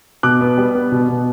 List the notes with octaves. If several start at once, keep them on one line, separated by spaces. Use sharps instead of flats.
B2 D6 F#6
B3
G3
B3
B2
B2